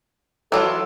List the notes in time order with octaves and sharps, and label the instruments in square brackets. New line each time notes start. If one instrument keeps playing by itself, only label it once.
[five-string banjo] E3 F#3 F4 [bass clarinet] A4